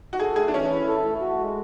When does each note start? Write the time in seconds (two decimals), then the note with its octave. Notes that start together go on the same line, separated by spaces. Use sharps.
0.13 F#4
0.20 G#4 A4
0.36 A3 G#4
0.48 D4
0.53 E3 C#4
0.70 E4
0.88 A4
1.05 A3
1.21 F#4
1.39 G#3